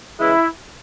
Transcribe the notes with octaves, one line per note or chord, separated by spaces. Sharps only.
C#3 E3 G#3 E4